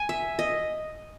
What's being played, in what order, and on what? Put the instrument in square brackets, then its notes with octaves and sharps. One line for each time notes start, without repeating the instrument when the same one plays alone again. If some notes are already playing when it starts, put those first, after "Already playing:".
Already playing: [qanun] G#5
E5
D#5